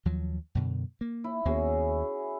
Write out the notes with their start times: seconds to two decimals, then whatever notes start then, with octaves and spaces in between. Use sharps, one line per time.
0.05 D#2 F3 F#3
0.55 F#2 B2 D3
1.01 A#3
1.24 E4
1.45 D#2 A#3 B3 C#4 F#4 G#4